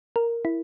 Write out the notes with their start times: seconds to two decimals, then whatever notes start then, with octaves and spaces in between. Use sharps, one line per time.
0.16 A#4
0.45 E4